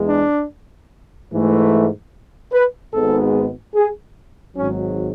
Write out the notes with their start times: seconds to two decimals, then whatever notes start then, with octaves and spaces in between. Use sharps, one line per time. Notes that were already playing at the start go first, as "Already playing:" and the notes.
Already playing: E2 G#3
0.08 D4
1.31 G#2 E3 A3
2.52 B4
2.93 G#1 G#2 G#3 B3 A4
3.75 G#4
4.57 G#1 G#2 F#3 C#4